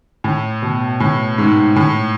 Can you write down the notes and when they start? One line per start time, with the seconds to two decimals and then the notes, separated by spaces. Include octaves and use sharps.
0.24 A2
0.62 B2
1.00 A2
1.38 G#2
1.76 A2